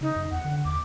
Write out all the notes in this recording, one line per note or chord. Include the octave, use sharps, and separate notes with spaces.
C#3 D#4
F#2
E2 F#5
D3
D#2 D6